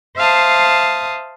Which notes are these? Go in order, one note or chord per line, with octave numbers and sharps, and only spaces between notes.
C5 E5 F5 A5 D#6